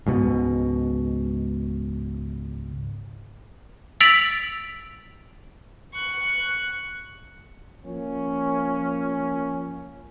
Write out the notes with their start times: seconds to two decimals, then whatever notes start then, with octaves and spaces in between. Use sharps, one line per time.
0.06 C#2 G#2 B2
4.01 E6 A6 B6 D7 F7 F#7
5.94 C#6 F#6
7.85 F3 A#3 C#4